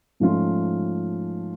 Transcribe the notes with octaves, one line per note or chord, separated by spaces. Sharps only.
G#2 F3 A3 C#4 F4